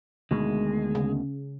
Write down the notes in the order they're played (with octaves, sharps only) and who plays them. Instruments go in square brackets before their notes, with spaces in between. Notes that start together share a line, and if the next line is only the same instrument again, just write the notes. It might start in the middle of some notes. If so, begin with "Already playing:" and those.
[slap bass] D2 B2 D#3 [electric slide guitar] G#3
[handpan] C#3